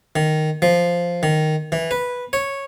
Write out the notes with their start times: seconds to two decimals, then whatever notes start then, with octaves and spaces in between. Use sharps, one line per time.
0.16 D#3
0.62 F3
1.23 D#3
1.72 E3
1.91 B4
2.33 C#5